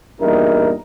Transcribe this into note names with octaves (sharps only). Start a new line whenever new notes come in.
E2 G2 A#2 D#4 E4 A#4